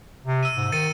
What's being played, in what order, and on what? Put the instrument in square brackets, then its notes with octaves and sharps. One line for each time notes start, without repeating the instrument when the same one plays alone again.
[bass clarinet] C3
[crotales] E6 D#7
[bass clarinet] G#2
[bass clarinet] D#3 [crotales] A6 C#7 D#7